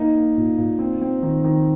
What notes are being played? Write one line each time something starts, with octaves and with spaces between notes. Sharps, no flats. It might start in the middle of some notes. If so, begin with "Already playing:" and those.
Already playing: A#3 D#4
A#3
A#2
A#2
C4
C4
D#3
D#3